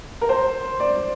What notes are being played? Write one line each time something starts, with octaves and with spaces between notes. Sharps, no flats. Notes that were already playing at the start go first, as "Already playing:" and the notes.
A#4
C5
D5